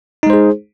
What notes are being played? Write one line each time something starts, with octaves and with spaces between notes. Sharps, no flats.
G#3 D#4 G#4 C5